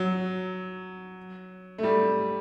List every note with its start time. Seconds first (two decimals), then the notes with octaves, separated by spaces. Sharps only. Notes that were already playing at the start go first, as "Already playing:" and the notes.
Already playing: F#3
1.78 A3
1.83 G3